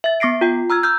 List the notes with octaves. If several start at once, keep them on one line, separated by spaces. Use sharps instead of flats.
E5 A6
B3 D6 A#6 C7 D7
F4 G5
A#5 E6 F6 G#6
E6 F6 G6